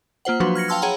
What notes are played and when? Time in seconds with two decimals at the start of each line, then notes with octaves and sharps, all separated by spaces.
0.25 A#3 F4 C5 F#5
0.40 F3 F#3 D4 F#4 B4
0.55 F6 G#6 A#6 C#7
0.68 F5 G5 A5 C6 E6 F6
0.82 G#4 C#5 F#5 G5 A#5 B5